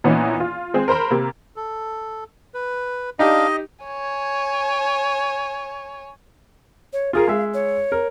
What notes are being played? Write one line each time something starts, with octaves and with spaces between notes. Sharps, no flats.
A#2 E3 B3 C#4 D#4 E4
F4
G#3 C4 G#4
A#4 C5 A#5 B5
C3 A#3
A4
B4
D4 D#4 G4 D#5 F5
C#5 G#5
C#5
F4 G#4 A#4 F5
G#3 E5
C#5
A#4